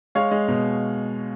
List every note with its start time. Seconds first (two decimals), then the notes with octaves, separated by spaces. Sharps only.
0.15 G#3 C#5 F5
0.31 G#3
0.48 B2